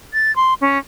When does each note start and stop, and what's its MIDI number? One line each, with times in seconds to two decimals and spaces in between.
0.13 0.34 93
0.36 0.54 84
0.61 0.78 61